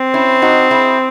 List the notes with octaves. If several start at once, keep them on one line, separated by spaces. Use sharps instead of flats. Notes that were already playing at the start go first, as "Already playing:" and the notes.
Already playing: C4
C#4 E4
D#4 F#4
E4 G#4